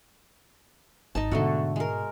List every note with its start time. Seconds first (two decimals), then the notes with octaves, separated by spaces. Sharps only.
1.15 G#1 D#4 D#5 A5
1.32 G#2 B2 D3 A3 F#4
1.76 G#3 A#4